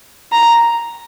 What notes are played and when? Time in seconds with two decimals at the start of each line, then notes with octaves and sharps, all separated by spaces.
0.32 A#5